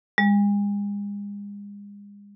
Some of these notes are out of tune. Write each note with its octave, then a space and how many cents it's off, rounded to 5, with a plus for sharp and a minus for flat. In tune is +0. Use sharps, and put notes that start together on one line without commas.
G#3 -40